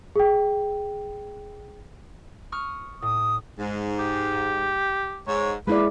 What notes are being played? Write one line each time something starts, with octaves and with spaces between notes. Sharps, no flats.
G#4 G5
C#6 D#6 F6
A2 D#6
G#2
G4
G#2 C#5
G#3 A#3 E4 B4 D5